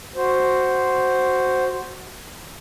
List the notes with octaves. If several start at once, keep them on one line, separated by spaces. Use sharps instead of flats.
F#4 C5